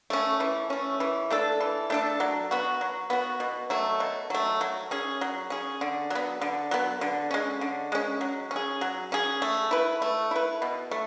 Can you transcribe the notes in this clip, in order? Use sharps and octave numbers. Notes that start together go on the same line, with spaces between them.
A3 C#4
E3
A3 C#4
E3
A3 D4 A4
E3
A3 D4 A4
F#3
B3 F#4
F#3
B3 F#4
B2
F#3 A3
B2
F#3 A3
F#3
C#4 G#4
F#3
C#4 G#4
D3
F#3 B3
D3
F#3 B3
D3
G#3 C#4
D3
G#3 C#4
F#3
C#4
G#4
F#3
C#4 G#4
A3
E4 B4
A3
E4 B4
B2
A3